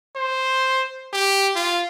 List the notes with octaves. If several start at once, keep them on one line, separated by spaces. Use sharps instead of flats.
C5
G4
F4